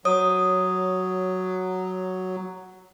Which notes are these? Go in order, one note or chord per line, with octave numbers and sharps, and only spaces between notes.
F#3 C#5 D#6